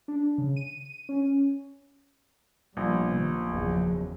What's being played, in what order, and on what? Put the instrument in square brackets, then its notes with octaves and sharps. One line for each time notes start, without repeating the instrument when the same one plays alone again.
[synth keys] D4
C#3
D#7
C#4
[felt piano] A#1 [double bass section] D3 G3 B3
[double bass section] C3 D#3
F#1 E2 F3